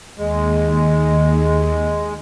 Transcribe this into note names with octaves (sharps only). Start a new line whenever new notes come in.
D#2 G#3